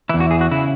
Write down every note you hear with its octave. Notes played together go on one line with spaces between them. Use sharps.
E2 E3 E4
F#4
G#4
F#4
C#3 E4